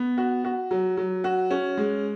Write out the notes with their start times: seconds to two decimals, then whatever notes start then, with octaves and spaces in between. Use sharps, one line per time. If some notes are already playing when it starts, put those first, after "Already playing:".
Already playing: B3
0.18 F#4
0.44 F#4
0.71 F#3
0.97 F#3
1.24 F#4
1.51 C#4
1.78 G#3